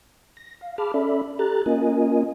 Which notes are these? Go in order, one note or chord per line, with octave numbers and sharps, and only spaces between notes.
A#6
F5
G#4 A5 B5 D6 F6
C#4 A4 D5 E5 B5
G4 A4 A#5 F#6 A6
A#3 C#4 F4 A#4 D#5 G#5